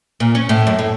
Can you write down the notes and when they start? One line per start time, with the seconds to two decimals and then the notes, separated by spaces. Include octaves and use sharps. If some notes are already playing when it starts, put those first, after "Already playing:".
0.20 A#2
0.35 C#4
0.49 A2
0.67 F#2
0.79 A2